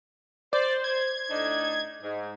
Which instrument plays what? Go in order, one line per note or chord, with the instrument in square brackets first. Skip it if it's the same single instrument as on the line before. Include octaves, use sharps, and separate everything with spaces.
[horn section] C5 [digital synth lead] D5
[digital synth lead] G#6
[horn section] A2 D4 D#4
G#2